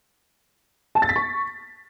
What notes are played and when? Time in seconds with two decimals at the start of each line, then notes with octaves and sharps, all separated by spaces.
0.95 A5
1.02 A6
1.09 B6
1.16 C#6